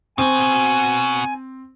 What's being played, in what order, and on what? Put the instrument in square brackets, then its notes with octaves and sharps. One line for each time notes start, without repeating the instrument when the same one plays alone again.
[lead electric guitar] B2 F#4 [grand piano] C4 [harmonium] G#5